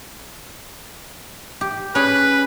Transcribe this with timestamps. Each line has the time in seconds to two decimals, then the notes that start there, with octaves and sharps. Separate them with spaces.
1.61 G4
1.95 C#4 G#4 B4